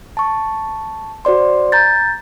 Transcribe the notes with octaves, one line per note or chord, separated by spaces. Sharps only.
A5 C#6
F#4 C5 D5 C6
A#5 G6 A6